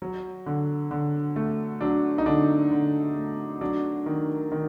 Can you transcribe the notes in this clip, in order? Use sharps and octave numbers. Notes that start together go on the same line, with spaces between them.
F#3
D3
D3
A3
F#3 D4
D#4
D3 D4
D3
A3
F#3 D4
D#3
D#3